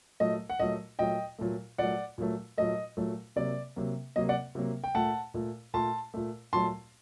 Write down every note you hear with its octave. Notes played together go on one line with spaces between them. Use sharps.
A#2 F#3 A3 D#5
F#5
A#2 F#3 A3 D#5
A#2 F#3 A3 D#5 G5
A#2 F#3 A3
A#2 F#3 A3 D5 F#5
A#2 F#3 A3
A#2 F#3 A3 D#5
A#2 F#3 A3
C3 F#3 A#3 D5
C3 F#3 A#3
C3 F#3 A#3 D#5
D5 F#5
C3 F#3 A#3
G5
A#2 A3 F#5 A5
A#2 A3
A#2 A3 A5 C6
A#2 A3
A#2 F#3 A3 A5 C6